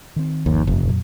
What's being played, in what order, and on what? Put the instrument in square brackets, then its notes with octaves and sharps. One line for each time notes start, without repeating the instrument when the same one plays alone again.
[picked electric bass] D#3 C4
[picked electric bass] G1 D3 F3 [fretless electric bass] D#2
[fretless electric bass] F1
[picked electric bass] F2 A#2 F#3